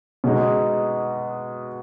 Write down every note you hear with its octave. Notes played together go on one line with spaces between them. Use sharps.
B2 G#3 D#4